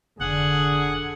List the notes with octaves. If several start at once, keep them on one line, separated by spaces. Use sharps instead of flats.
F1 D3 G#4 F#5